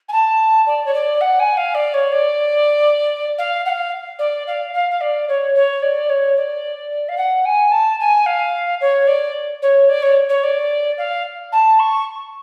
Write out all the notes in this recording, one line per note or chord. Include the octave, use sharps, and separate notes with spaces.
G#5
A5
D5
C#5
D5
F#5
G#5
F5
D5
C#5
D5
F5
F#5
F5
D5
F5
F5
F5
D5
C#5
C#5
D5
C#5
D5
F5
F#5
G#5
A5
G#5
F5
C#5
D5
C#5
D5
C#5
C#5
D5
F5
A5
C#6